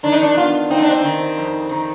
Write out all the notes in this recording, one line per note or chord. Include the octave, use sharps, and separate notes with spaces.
D#3 D4
D#4
D4
B3 F4
C4 D#4
D4
C4
D#3
F2
D#3